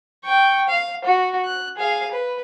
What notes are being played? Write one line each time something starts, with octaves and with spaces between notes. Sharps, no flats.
G5 C#6
F5
F#4
F#6
G#4 F5
B4